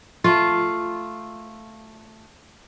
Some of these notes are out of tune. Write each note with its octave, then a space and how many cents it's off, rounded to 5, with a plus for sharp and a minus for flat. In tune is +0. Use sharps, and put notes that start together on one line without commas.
A3 +0 F4 +0